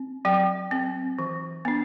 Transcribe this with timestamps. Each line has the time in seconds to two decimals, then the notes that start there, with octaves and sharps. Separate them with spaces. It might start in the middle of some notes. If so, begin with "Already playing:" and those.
Already playing: C4
0.25 F#3 G5
0.71 C4
1.19 E3
1.65 B3 D4